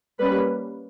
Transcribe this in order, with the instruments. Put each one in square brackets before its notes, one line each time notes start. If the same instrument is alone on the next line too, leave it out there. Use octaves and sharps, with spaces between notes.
[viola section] G3 A#3 C#4 B4